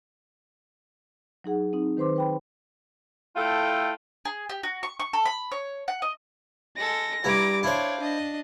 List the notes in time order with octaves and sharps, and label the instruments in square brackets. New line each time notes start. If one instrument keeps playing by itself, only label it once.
[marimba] F#3 D#4 G#4 F#5
C4 D#4
D#3 B4 C5 C6 D6
B4 G5 B5
[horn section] A3 E4 F4 A4 G5
[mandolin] G#4
G4
F#4
C#6
C#6
A4
B5
C#5
F#5
D#5
[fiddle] G#3 A4 [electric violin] A#6
[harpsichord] G2 E4 [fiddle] A#5 D6
[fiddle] D4 [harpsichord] E4 C5 [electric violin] C#5 F5
[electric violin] D4 [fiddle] D#5